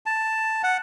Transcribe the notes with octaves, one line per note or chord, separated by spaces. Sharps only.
A5
F#5